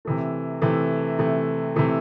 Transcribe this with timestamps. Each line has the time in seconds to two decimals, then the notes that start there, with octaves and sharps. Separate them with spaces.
0.05 C3 E3 A3
0.62 C3 E3 A3
1.19 C3 E3 A3
1.76 C3 E3 A3